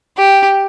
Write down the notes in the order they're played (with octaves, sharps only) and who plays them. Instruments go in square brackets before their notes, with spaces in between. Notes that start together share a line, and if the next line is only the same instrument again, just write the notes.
[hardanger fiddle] G4